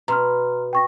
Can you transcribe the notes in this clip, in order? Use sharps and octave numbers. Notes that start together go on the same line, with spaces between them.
B2 A#5 C6 F6
G5 C#6 A#6